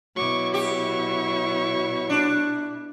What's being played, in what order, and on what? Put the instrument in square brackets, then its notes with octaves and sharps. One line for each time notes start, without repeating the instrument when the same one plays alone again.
[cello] B2 E4 [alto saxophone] F#3 [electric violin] C#6 D6
[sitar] G4 [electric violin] C#6
[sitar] D4